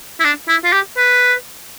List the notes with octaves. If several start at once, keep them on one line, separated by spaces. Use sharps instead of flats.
E4
D4
E4
F4
G4
B4